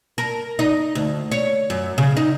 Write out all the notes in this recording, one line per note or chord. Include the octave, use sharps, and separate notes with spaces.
A#4
D#4
D2
C#5
F#2
C#3
D#4